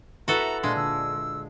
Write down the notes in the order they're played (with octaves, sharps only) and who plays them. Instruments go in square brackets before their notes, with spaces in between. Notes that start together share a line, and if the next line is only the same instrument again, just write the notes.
[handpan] E4 B4 E5 [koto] F#4 A4 [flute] A#5
[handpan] A#2 D4 F5 [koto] G#3 [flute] C6
[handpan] D3 [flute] E6